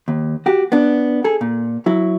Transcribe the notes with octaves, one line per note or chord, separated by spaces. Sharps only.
D#2
F#4 G4
B3 D4
G#4 A4
A#2
F#3 E4